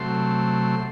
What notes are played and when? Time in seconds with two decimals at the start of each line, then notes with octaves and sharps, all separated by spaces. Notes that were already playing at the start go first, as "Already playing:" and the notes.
Already playing: C3 F#3 A3 C6